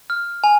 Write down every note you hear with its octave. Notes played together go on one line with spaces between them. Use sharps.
F6
G#5